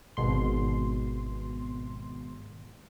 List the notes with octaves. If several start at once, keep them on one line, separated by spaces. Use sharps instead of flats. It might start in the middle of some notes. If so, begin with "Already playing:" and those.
G#1 B2 C6